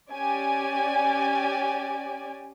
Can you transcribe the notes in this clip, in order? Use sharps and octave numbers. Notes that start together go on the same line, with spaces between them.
C#4 G4 D5 G#5